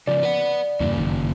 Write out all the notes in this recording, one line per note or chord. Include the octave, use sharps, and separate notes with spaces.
C#3 F3 D5
B4 F#5
E2 G2 C#3 A#3
G1 F#2 D#3